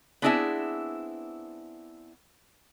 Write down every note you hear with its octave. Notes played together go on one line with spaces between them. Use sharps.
B3 C4 D4 E4 G#4 E5